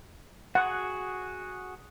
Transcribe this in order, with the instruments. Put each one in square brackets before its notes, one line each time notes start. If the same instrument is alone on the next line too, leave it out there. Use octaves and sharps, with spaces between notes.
[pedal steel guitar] F#4 G#4 [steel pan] F#5